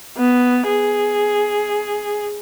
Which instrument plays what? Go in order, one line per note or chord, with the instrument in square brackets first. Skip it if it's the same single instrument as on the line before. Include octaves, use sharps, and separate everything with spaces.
[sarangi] B3
G#4